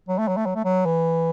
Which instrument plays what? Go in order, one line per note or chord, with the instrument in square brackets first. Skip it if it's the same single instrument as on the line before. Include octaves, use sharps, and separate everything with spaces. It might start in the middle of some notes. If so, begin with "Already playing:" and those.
[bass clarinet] F#3
A3
F#3
A3
F#3
A3
F#3
E3